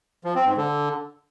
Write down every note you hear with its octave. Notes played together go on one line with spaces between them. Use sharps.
F3
C4
G#2
D3